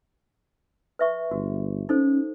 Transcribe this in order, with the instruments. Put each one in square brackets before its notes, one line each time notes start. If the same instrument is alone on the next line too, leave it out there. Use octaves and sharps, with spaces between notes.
[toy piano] B4 E5 C#6
[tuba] G1 [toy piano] F#4
[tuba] C#4 [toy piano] D#4 A4 C5